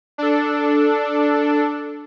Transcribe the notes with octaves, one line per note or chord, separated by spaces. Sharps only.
D4 A4